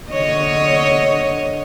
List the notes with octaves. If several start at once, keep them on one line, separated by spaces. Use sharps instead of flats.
D3 C#5 D#5